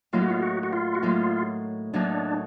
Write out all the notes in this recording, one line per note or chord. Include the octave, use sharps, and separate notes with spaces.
A2 F#3 A#3 D#4 F4
F#4
F4
F#4
F#4
F4
F#4
A2 F#3 A#3 D#4 F4
A2 F#3 A#3 D4 D#4